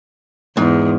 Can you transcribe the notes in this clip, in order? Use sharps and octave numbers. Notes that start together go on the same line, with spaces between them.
E2 G#2